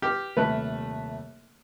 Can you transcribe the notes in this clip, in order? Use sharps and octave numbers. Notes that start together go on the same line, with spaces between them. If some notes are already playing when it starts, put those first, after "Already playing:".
G4 B4 F6
D#1 C3 A3 B4 F#6